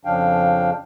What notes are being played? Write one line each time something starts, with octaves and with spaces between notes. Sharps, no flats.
F2 C#3 F3 D4 F5 G5